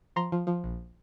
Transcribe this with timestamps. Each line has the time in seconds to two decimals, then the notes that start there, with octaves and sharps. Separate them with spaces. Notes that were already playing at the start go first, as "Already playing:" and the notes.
0.16 F3 A#5 C6
0.32 F3
0.47 F3
0.64 A#1